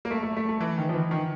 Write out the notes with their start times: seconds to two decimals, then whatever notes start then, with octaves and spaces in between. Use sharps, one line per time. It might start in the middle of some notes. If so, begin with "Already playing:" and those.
0.05 A#3
0.11 A3
0.23 A3
0.37 A3
0.49 A3
0.61 E3
0.78 D#3
0.89 F3
0.94 E3
1.11 D#3